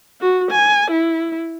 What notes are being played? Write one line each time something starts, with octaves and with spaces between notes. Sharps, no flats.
F#4
G#5
E4